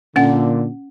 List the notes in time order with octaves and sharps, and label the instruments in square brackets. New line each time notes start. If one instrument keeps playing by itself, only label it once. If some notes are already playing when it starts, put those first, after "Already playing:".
[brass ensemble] A#2 D3 [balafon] C#4 F#5